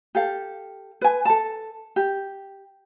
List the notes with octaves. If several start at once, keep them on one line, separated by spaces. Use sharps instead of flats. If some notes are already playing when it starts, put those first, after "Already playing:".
G4 A4 F5
B4 G#5
A4 A5
G4